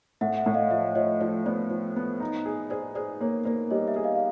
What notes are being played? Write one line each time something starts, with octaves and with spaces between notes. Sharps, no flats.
A2 E5 F#5
E5 F#5
A2
D#5 F5
F3 D5 E5
F3 C#5 D#5
F3 C5 D5
B3 C5 D5
F3
B3
D#4
G#4
G#4 C5 D5
G#4 C5 D5
A#3 C#5
A#3 C5 D5
G3 C#5 D#5
D5 E5
G#4
D#5 F5
F5